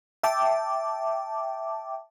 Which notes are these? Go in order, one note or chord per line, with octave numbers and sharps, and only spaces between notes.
E5 G5 A5 D6